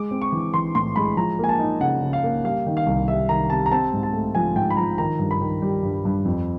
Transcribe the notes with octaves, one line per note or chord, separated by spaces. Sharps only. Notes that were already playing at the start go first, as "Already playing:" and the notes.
Already playing: G#3 D6
C4
C#6
E3
E3 C6
A2 C6
G#3 B5
F3 A#5
A#3 G#5
A5
D#4
C#3 F#5
C#3
F5
A#3
G3 F5
D#3
F5
C2
G3 E5
D#3 A#5
C3 A5
A#5
C4 A5
G#2
A5
A3
F3 G#5
G#2 G5
B5
F3 A#5
D#3 A#5
G2
B5
D#3
G3
G2
G2
F2